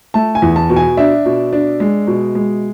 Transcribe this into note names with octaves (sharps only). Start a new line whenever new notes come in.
A3 A5
G#5
E2
A5
B2
G#5
D4 E5
B2
D4
G#3
B2
G#3